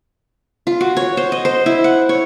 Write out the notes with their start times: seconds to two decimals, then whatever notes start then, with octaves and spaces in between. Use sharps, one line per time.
0.67 F4
0.81 F#4
0.97 C#5
1.17 C5
1.32 D#5
1.45 C5
1.66 E4
1.84 F#5
2.09 C#5